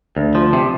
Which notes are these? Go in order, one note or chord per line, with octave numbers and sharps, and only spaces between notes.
D2
F3
C3